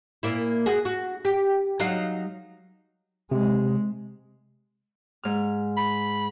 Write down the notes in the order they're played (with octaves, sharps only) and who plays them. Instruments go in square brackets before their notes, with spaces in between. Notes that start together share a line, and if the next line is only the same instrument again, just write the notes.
[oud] A#2 A#3 E4
F#4 G#4
F#4
G4
F#3 D#4 F5
[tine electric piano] C3 [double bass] G#3
[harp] G#2 F6
[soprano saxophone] B5